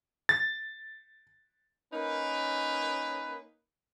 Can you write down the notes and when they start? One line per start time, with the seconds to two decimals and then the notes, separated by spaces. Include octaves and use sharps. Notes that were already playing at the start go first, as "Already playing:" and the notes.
0.29 A6
1.92 A#3 C#4 D#4 A#4 B4